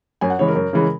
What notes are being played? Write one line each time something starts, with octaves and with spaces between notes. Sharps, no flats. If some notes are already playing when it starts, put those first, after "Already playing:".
F#2 G#5
F#5
C#3 E3 G#3 C#5
A#4
F#2
C#3 E3 G#3